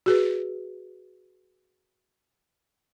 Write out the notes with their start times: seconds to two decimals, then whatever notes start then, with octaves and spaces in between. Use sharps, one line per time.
0.06 F#4 G#4 B4